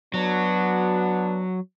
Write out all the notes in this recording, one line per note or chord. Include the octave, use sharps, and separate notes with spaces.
F#3 B3 D4 F#4